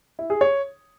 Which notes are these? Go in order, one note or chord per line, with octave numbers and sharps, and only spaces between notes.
E4
G#4
C#5